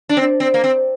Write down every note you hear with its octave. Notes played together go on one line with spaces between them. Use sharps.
D4
C4
C4
A#3
C4